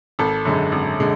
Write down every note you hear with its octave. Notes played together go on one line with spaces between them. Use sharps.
G#1 A4
F#2 D3 G#3
G#1
D3 G#3